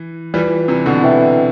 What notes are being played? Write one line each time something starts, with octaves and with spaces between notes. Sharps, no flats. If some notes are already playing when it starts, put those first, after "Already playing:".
Already playing: E3
E3 G3 F4 B4 D5
C3 E3
B2 D3
E4 B4 E5 G5